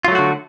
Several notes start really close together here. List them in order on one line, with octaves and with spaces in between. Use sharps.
F4 F#3 A3 F#4 D3